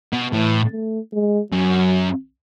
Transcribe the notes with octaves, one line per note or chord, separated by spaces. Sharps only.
B2
A2 E3
A3
G#3
F#2 F#3